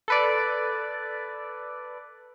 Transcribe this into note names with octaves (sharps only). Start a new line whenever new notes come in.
A4 B4 D5